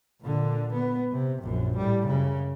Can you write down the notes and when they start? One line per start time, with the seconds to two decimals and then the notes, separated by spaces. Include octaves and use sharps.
0.22 A#2 D3
0.74 B3
1.12 C3
1.43 A#1 F#2
1.77 A2 G3
2.07 F#2 C#3